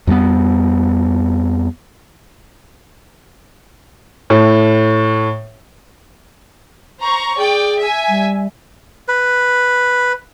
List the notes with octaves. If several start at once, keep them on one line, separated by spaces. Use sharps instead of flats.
F2 G3 A#3 B3
A2
C5 A#5 C#6
G#4 D5 G5
E5 G#5
G3
B4